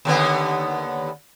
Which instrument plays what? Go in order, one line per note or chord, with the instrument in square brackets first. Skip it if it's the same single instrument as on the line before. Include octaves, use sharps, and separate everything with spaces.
[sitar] D#2 D3 B3